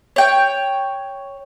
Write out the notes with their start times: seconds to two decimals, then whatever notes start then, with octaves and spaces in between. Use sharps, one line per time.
0.16 C#5 G5